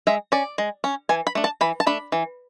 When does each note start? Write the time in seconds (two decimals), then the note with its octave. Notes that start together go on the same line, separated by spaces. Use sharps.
0.07 G#3 E5
0.32 C#4 D5
0.58 G#3
0.84 C#4
1.09 E3 G#5
1.27 B5
1.35 A3 D4
1.44 A5
1.61 E3 B5
1.80 A5
1.86 A3 D4 B5
2.12 E3